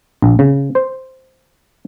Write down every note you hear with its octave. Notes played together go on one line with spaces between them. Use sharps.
A#1
C#3
C5